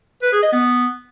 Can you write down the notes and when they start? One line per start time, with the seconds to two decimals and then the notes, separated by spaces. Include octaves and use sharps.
0.22 B4
0.32 G#4
0.42 D#5
0.52 B3